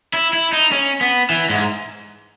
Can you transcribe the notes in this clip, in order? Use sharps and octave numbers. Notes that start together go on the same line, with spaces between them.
E4
E4
D#4
C#4
B3
E3
G#2